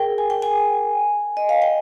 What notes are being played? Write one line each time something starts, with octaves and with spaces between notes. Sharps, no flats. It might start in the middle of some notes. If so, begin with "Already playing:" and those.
Already playing: G#4 A#4 G5
G#5
G5
G#5
D#5
F5
G5